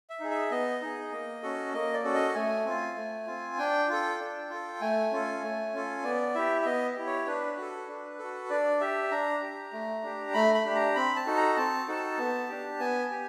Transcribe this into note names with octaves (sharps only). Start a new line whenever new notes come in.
E5
D#4 G#4
E5
B3 D#5
D#4 G#4
A#3
C#4 F#4 A4
A#3 D#5
D5
C#4 F#4 A4
D#5
A3 G#5
C4 F4
A3
C4 F4
D4 G5
F4 A4
D4
F4 A4
A3 G#5
C#4 F4 A4
A3
C#4 F4 A4
B3 D5
E4 G4 E5
E5
B3 D#5
E4 G4
C#5
D4 B4
F#4 A4
D4
F#4 A4
D4 D5
G4 E5
D4 A#5
G4
A3
D4 G4
A3 B5
B5
D4 G4
A#5
C4 B5
A5
D#4 F#4 A4
A#5
C4 A5
D#4 F#4 A4
B3
D4 G4
B3 G#5
G4